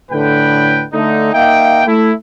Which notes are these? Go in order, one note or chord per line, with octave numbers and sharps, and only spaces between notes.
A2 D3 B4 G5
D3 A3 D#4
A#3 D#4 E5 F5 G5
A3 E4